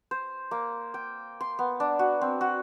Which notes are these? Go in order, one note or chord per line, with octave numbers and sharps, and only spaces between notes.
C5
A#3
G5
C6
B3
D4
F#4
C4
F#4